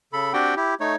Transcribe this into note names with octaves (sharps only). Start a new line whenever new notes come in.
C#3 A4 B5
C4 D4 F#4 G4 F#5 G5
E4 G4
A3 D#4 C#5